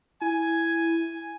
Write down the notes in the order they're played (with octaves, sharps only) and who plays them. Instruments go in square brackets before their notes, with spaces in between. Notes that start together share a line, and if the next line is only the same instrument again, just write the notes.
[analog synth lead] E4 [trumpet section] G#5